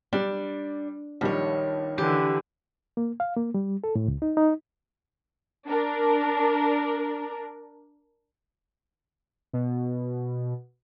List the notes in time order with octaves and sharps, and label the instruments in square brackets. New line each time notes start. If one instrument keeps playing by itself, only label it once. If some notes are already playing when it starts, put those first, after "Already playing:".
[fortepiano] G3 [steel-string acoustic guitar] D4
[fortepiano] A#1 G3 [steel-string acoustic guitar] D#3 C#5
[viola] D3 E3 [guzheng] G4
[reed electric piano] A#3
F5
A#3
G3
A4
A2
C#2
D#4
D#4
[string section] D4 A#4
[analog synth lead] B2